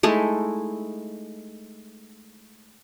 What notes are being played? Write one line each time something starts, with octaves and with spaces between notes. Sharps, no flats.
G#3 A3 D#4 E4